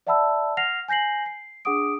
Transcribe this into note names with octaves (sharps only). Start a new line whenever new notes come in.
D5 E5 F#5 A5 B5 E6
F#5 F6 A#6 C7 F7
G#5 G6 A#6 C7 F#7
C7
D4 G#4 F#5 D6 D#6 D7